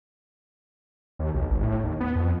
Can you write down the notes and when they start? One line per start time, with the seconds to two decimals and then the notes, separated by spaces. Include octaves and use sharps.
1.19 D#2
1.34 B1
1.49 G1
1.63 A2
1.84 D#2
2.00 B3
2.15 F2